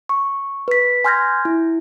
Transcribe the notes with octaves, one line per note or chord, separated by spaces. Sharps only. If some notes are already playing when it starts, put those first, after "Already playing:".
C#6
B4 B6
G#5 C6 F6 G6 G#6 A#6
E4